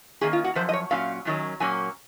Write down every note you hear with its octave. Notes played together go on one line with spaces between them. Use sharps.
D#3 A#3 C#4 G#4
F4
F#4
F#2 F3 C5
D#5
C#5
A#2 F#3 C#4 F5
F#2 D#3 F#3 C#4
A#2 F#3 A#3 C#4 G#5